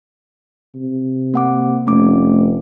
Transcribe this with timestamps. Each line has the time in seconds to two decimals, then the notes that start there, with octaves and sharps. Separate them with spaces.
0.75 C3
1.34 A#3 F#5 D6
1.87 F1 A3 C#4 D6